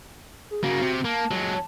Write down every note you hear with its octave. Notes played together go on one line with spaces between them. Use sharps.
G#4
C#3 A#3 F#4
C3
A#3 A5
F#3 G#3